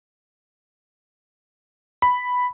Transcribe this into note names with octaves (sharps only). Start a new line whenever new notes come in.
B5